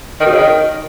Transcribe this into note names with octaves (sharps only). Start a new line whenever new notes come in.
D#3
B2
C#3
D#3